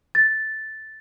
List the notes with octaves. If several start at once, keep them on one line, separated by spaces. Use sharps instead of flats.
A6